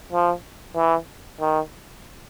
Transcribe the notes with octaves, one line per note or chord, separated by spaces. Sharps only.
F3
E3
D#3